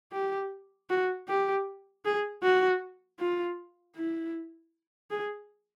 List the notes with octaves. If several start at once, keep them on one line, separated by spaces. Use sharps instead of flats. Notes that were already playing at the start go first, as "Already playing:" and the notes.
G4
F#4
G4
G#4
F#4
F4
E4
G#4